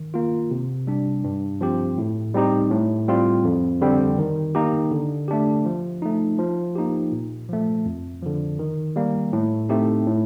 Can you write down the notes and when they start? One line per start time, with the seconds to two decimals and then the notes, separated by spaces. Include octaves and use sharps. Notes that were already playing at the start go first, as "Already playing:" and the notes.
Already playing: D#3
0.14 A#3 F4
0.51 C3
0.87 G3 D4
1.24 G2
1.61 F3 C4 G4
1.98 A2
2.34 G3 C4 D#4 G4
2.71 A2
3.08 G3 C4 F4
3.45 F2
3.81 D3 G3 C4
4.18 D#3
4.55 A#3 D#4 G4
4.91 D3
5.28 A3 D4 G4
5.65 F3
6.02 A3 D#4
6.39 F3
6.75 A#3 D#4 G4
7.12 A#2
7.49 F3 A3
7.85 F2
8.22 D3 F3
8.59 D#3
8.96 G3 A#3
9.33 A2
9.69 A3 C4 D#4 G4
10.06 A2